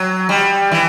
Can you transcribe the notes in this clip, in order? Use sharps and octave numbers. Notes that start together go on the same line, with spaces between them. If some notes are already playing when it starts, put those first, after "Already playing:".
Already playing: F#3
G3
E3